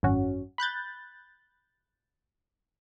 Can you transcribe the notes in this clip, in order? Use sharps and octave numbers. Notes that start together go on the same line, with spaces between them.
G#1 F#2 C#4 F#4
B5 F#6 G6 A6